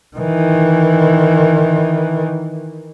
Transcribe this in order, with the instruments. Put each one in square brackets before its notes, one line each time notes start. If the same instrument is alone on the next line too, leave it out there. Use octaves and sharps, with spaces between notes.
[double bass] D#3 E3